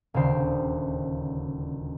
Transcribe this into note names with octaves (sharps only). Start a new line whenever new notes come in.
D#1 D2 C#3 G4 C5 C7